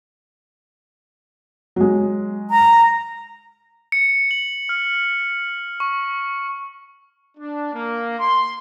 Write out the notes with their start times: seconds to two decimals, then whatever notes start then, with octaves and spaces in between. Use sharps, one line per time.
1.76 F#3 G#3
2.51 A#5
3.92 C#7
4.31 F#7
4.69 F6
5.80 C#6
7.38 D4
7.73 A#3
8.19 C6